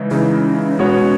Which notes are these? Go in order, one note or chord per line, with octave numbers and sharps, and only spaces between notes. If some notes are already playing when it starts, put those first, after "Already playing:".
Already playing: C#3 E3 G#3 D#4
C#3 E3 G#3 C#4 D#4
B2 G#3 B3 F#4 C#5